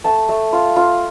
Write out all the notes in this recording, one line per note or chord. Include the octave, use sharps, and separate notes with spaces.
A3 A5
A3
F4
F4